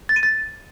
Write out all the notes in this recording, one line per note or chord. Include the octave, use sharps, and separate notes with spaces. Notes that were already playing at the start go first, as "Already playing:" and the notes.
A6
D#7
A6